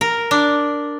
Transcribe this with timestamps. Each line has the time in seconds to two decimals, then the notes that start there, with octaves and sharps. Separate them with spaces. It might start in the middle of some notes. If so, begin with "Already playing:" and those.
0.01 A#4
0.31 D4